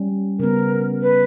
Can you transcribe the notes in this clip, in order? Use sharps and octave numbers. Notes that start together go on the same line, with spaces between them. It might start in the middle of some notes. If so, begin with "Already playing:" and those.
Already playing: G3 C#4
C#3 G3 B3 A#4
B4